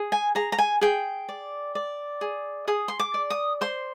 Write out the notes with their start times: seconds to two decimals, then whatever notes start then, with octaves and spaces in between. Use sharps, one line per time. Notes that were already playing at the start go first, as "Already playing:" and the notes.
Already playing: G#4
0.12 G#5
0.35 G#4 A#5
0.52 A#5
0.58 G#5
0.81 G#4 G5
1.29 D5
1.75 D5
2.21 G#4
2.68 G#4 D#6
2.88 C6
2.99 D6
3.14 D5
3.30 D#6
3.61 C5 C6